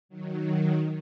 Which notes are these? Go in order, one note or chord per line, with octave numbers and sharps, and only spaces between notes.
D#3 F#3